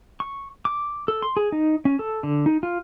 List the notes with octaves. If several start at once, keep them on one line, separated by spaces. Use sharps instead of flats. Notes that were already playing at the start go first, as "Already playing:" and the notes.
C#6
D6
A4
C6
G#4
D#4
C#4
A4
D3
D#4
F4